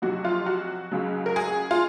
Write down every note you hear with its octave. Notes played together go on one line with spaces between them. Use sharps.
F2 C3 F#3 F#4
F4
F#4
C#2 C#3 F#3
A#4
G#4
F4